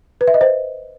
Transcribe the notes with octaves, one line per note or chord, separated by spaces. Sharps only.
B4
E5
D#5
C5